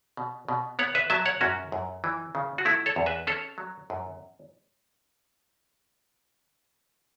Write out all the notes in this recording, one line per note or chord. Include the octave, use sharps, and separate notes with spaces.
B2
B2
B3 C#5 F#5
B4 E5
F#3 E5 A5
C#5 F#5
F#2 C#4 F#4
F#2
E3
C#3
F#4
A3 E4
A4 C#5
E2
B4 E5
C#4 A4 C#5
F#3
F#2